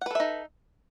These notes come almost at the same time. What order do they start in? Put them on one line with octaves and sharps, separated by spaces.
F#5 B4 A4 E5 D#4